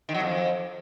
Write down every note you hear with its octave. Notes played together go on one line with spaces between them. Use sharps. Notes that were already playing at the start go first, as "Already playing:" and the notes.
D#3
F#3
F2